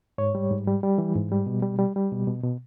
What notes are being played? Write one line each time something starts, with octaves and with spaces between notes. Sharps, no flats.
G#2 C#5
G3
G#2
G3
G3
E3
G#2
G3
B2
G3
G3
G3
B2
B2
B2